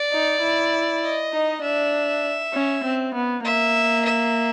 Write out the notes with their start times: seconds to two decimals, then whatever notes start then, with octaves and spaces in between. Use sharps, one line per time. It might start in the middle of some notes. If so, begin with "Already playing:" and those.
Already playing: D5
0.12 D#4
0.42 E4
1.03 D#5
1.33 D#4
1.63 D4 E5
2.54 C#4
2.84 C4
3.14 B3
3.45 A#3 E5
4.05 E5